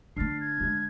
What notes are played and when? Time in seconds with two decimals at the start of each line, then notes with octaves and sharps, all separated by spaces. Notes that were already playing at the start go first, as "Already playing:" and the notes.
0.16 D3 A3 D4 F6 A6 C7
0.41 G#6
0.61 D3 G#3